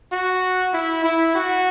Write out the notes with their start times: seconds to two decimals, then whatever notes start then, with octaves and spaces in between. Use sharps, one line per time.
0.12 F#4
0.73 E4
1.04 E4
1.35 F#4